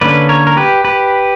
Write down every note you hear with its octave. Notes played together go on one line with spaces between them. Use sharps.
D3 A#3 C#4 B4 D5
A#4 C#5
A#4
G4 B4
G4 B4